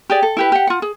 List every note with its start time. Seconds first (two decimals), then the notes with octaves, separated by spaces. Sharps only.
0.10 G4 G#4 D5
0.22 A4
0.37 E4 G4 B4
0.52 G4 F#5
0.67 F4 F#5
0.82 G#4